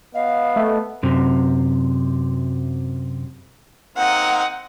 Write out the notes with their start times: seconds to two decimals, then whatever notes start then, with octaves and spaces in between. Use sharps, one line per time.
0.14 B3 D#5 F5
0.56 A3
1.03 F#2 C3
3.97 A#3 C4 D#4 F#5